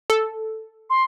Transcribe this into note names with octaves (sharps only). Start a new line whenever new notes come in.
A4
C6